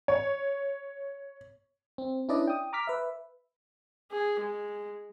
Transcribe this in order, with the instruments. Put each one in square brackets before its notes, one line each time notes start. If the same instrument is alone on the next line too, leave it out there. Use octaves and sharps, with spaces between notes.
[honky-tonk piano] C#5
[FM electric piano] C4
C#4 D4 E4 B4 D5 D#5
G5 D#6
A#5 D6 F6 B6
B4 E5
[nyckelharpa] G#4
G#3